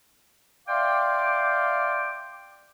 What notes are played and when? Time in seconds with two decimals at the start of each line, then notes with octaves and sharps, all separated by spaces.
0.68 D5 E5 F5 G5 C6 D6